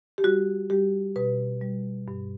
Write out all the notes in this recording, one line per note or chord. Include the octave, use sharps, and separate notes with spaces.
G4
G3 F#4
G3 G4
B2 B4
G3
G2